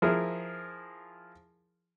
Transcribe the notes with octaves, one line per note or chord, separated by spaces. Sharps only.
F3 E4 G#4 A#4